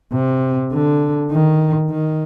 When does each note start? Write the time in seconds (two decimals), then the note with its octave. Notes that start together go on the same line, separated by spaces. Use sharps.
0.13 C3
0.72 D3
1.31 D#3
1.90 D#3